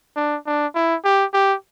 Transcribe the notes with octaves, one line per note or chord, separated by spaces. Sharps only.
D4
D4
E4
G4
G4